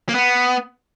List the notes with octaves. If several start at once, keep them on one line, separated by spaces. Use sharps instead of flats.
A#3
B3